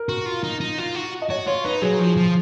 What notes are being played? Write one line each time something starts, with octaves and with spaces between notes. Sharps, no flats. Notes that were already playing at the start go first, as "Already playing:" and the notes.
Already playing: A#4
F#4
F4
D#4
D#4
F4
F#4
D#5
F#4 C#5
F4 C#5
D#4 B4
F#3 G#4
F3
F3